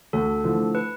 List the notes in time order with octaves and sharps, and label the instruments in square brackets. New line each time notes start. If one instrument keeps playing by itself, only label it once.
[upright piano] D2 [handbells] A4
[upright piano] D3 F3 A3 E4
[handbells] B4